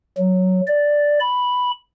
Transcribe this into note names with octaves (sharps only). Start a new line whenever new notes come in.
F#3
D5
B5